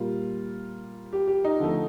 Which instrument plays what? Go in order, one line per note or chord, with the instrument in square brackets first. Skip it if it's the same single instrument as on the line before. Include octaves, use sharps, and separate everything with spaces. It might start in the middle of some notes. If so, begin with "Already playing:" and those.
Already playing: [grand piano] A#2 G3 A#3 F4
G4
G4
D#4
D3 F3 A3